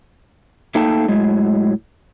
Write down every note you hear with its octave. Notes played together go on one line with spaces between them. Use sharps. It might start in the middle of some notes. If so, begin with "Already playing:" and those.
A3 A#3 D#4 A4 G5 A5
A2 F#3 G#3